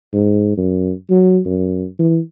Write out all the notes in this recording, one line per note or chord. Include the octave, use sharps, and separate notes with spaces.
G#2
F#2
F#3
F#2
E3